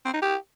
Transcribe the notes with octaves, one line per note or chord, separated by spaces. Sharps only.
C4
D#4
G4